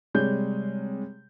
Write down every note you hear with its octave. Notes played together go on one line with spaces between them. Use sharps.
C3 G3 G#3 G#4 C#5 G6